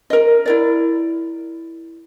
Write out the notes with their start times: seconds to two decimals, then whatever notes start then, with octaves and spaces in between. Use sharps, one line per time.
0.10 A#4 D#5
0.46 E4 A#4 D5